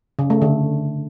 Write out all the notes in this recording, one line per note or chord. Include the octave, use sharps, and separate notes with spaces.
C#3
A3
D3